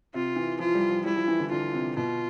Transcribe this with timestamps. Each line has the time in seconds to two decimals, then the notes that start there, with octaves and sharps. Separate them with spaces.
0.14 C3 F4
0.36 E3
0.59 F3 F4
0.74 G3
0.90 F3
1.05 G3 E4
1.16 F3
1.28 E3
1.39 D3
1.51 D3 F4
1.73 C3
1.96 B2 F4